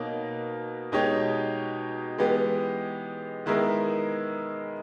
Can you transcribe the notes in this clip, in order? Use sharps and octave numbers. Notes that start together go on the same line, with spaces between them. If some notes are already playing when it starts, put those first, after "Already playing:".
Already playing: B2 A#3 D#4 A#4 C#5
B2 G#3 D#4 G4 C#5
E3 G#3 B3 G4
D#3 G#3 B3 E4 A#4